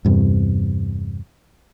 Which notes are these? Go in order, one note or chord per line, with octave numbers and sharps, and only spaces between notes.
E2 G2 C3